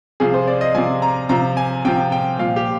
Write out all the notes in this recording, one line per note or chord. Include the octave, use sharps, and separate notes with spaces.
C3 F3 G#4
C5
D5
D#5
C3 F3 G#5
A#5
C3 F3 A#5
G#5
C3 F3 G5
G5
A#2 F3 F5
G4